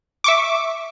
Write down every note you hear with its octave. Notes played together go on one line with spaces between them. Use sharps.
E5 C#6 D6